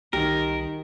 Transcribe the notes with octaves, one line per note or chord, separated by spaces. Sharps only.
C2 D#3 G4 A#4